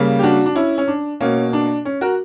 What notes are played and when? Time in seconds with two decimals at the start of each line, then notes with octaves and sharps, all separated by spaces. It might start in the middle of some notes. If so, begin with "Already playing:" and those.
Already playing: C#3 G3 A#3
0.19 G4
0.23 D4 F#4
0.46 D4
0.55 C#4 E4
0.78 C#4
0.88 D4
1.20 B2 A#3 C#4
1.53 D4
1.85 C#4
2.01 F#4 A#4